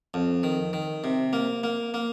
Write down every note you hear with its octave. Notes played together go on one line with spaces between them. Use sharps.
F2
D#3
D#3
C3
A#3
A#3
A#3